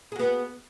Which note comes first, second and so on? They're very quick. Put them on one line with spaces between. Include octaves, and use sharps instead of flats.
G#4 F#4 B3